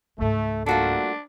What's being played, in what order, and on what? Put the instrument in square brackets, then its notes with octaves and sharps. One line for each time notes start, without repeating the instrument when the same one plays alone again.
[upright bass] C#2 G#2 [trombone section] A3
[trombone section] G3 A3 A#3 [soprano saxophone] D4 [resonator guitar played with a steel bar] F4 F#4 A4